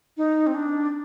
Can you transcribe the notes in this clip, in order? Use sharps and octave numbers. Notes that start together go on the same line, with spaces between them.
D#4
C4
D4